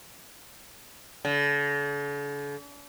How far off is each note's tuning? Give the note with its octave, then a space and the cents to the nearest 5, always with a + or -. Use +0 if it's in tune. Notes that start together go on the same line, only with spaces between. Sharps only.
D3 -45